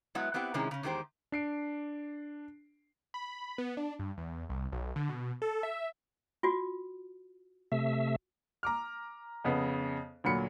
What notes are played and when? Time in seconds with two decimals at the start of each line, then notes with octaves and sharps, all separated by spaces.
0.15 F#3 G#3 B3 E4 E5 F#5
0.34 B3 C4 E4 G4 F#5
0.54 C3 D#3 G#3 C#4 E4 G#4
0.71 C#3 C#4
0.83 E2 D#3 G#3 C4 G4 C5
1.32 D4 C7 D7
3.14 B5
3.58 B3
3.77 D4
3.99 G2
4.18 E2
4.49 C2
4.72 B1
4.96 D3
5.09 B2
5.42 A4
5.63 E5
6.43 F4 F#4
7.72 C3 A3 E5
8.63 A#5 D6 F6
9.44 F2 C#3 B3
10.24 D2 A#2 F#3 B5 C#7